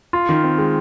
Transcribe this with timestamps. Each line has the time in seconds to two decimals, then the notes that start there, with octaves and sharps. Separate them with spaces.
0.13 F4
0.29 D#3
0.44 C4
0.58 G#3